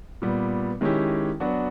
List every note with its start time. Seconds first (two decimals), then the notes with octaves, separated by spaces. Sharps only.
0.22 A#2 G3 B3
0.81 D#3 G#3 C#4 E4 G4
1.40 F#3 B3 D4 F#4